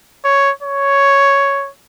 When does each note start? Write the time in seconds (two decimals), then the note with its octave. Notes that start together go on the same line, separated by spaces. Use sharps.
0.25 C#5
0.63 C#5